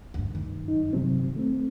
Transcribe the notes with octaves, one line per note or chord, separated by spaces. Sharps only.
D2 G2
C2 G2 D#3
F#2 D#4
C3 F#3 C4
A3 C4